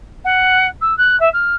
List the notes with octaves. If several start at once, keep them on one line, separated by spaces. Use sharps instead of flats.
F#5
E6
F#6
E5
F6